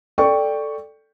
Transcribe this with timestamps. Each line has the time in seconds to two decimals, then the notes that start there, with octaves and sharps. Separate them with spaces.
0.18 A4 D5 G5 C#6